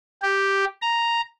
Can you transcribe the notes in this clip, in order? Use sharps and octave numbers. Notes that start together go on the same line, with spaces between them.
G4
A#5